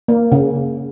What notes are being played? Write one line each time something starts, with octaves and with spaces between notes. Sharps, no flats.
A#3
C#3